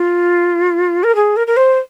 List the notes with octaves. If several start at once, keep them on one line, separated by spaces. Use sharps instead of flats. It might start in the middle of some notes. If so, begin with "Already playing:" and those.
Already playing: F4
A#4
G#4
A#4
A#4
C5